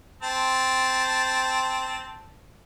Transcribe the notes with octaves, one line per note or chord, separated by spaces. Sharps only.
C4 A5